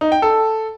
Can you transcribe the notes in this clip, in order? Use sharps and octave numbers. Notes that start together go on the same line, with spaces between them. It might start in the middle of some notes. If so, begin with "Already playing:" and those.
D#4
G5
A4